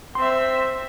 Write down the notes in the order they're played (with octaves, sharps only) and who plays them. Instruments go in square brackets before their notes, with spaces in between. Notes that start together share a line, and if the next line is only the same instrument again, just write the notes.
[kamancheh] C4 E5 [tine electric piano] C6